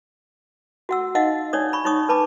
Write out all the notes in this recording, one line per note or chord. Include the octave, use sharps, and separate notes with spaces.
F#4 F#5 E6
D#4 D#5 F5 F#5
D4 D#4 C#5 D5 D#6
B5 C#6
D#4 C#5 C#6 D#6
D4 B4 A5 B5 D6